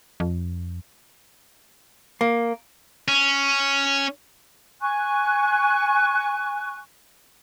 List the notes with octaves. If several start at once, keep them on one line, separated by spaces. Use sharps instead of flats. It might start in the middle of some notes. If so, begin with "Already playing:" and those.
F2
A#3
C#4
G#5 C#6 F#6